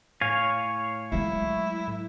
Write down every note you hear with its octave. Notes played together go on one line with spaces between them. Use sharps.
A2 C#5 F5 G#5
F#3 G#3 E4